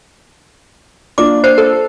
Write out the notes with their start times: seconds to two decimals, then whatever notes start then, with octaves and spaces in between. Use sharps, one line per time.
1.18 A#3 D4 F4 D6
1.44 C5 C7
1.58 A4 A#4